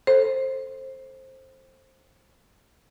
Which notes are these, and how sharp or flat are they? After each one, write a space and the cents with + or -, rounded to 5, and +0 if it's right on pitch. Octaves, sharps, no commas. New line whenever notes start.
A4 +0 C5 +15